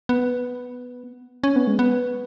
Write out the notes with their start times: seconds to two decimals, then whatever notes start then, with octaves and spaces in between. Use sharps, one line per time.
0.09 B3
1.44 C#4
1.56 B3
1.67 G#3
1.79 B3